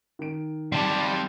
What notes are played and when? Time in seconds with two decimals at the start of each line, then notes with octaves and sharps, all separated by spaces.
0.19 D#3 D7
0.72 G3 C4 A5